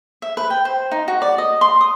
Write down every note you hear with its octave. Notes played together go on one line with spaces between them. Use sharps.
E5
B4
G5
C5
D#4
F#4
D5
D#5
C6
D#6